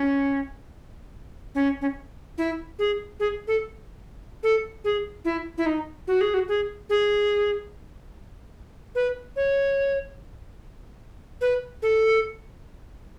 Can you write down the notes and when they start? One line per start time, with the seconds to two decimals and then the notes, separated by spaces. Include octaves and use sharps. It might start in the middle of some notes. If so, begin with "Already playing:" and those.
Already playing: C#4
1.55 C#4
1.81 C#4
2.38 E4
2.79 G#4
3.20 G#4
3.47 A4
4.43 A4
4.84 G#4
5.25 E4
5.58 E4
5.66 D#4
6.07 F#4
6.21 G#4
6.34 F#4
6.48 G#4
6.90 G#4
8.95 B4
9.36 C#5
11.41 B4
11.82 A4